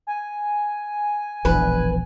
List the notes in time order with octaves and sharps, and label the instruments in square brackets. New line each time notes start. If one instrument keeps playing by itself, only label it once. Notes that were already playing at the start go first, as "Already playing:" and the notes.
[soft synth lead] G#5
[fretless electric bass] E1 A#1 E2 [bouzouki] B4